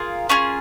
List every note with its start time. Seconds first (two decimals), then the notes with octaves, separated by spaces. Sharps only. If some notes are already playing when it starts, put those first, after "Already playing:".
Already playing: F4 G#4 A#4
0.29 C#4 F4 G#4